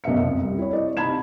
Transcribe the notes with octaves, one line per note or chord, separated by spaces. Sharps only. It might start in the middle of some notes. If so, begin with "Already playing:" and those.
B1 F#2 E5 C#7
C2 F2
G3
E4 C#5
D5 D#5
C3 D#4 A5 B5 G#6 E7